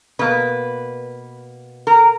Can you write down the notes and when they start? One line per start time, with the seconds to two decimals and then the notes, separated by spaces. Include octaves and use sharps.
0.19 B2 A#3 B4
1.87 A#4